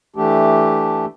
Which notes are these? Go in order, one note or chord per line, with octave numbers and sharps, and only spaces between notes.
E3 A3 D4 G4